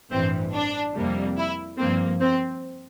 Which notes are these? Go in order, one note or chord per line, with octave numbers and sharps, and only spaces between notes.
A1 G2 E3 C4
D4
F2 C3 G3 A#3
E4
G2 F3 A#3 C4
C4